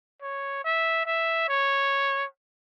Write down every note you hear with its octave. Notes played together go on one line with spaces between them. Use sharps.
C#5
E5
E5
C#5